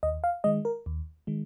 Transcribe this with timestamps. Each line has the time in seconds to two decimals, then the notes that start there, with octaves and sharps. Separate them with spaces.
0.03 D#2 D#5
0.24 F5
0.44 D#3 G#3 D#5
0.65 A#4
0.86 D#2
1.27 D#3 G#3